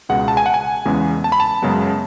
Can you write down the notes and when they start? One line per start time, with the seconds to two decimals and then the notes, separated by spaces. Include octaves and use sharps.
0.09 C#2 B2 G#3 B3 F#5
0.28 A5
0.37 G#5
0.46 F#5
0.54 G#5
0.85 E2 C#3 G#3 B3
1.24 A5
1.32 B5
1.40 A5
1.62 F#2 C#3 G#3 B3